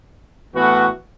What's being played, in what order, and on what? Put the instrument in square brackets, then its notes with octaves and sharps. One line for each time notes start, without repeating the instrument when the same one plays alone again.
[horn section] A2 E3 B3 F#4